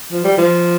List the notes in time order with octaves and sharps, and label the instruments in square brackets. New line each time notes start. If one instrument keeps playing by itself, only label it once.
[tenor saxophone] F3
G3
F3